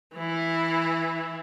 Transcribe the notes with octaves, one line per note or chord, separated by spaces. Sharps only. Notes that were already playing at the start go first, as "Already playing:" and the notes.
E3 E4